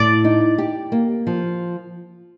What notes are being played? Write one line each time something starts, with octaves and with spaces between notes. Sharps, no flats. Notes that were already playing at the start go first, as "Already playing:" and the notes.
Already playing: A2 D5
D#4
G4
A#3
F3